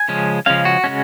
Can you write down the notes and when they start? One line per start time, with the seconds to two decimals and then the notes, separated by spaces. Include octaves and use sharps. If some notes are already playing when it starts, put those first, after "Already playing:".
Already playing: G#5
0.08 C#3 F3 G#3 C#4
0.46 C#3 F3 G#3 C#4 F5
0.65 F#4
0.84 C#3 G#3 C#4